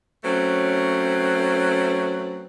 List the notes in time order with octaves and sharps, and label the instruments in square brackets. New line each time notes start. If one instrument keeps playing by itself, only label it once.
[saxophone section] F#3 A3 C4 C#4 B4